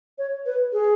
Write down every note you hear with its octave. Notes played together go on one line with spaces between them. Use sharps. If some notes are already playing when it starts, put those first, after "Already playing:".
C#5
B4
G#4